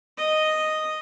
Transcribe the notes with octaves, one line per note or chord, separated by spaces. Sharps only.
D#5